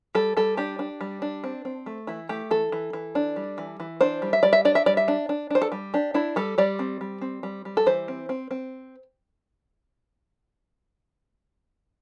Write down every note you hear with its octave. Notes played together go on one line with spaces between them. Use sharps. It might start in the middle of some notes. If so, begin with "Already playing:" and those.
G3 A4
G3 A4
D4 G4
D4
G3
D4
C4
C4
A3
E3 E4
A3 G4
E3 A4
E3
E3
D4
G3
E3
E3
D4 C5
G3
E5
G3 D5
E5
D4 D5
E5
G3 D5
E5
D4
D4
D4 C5
A4
G3
D4 G4
D4 E4
G3 A4
G3 D5
C4
G3
C4
G3
G3
A4
E3 C5
C4
C4
C4